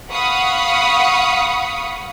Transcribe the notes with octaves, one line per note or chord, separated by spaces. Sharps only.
F5 F#5 B5 C#6 D#6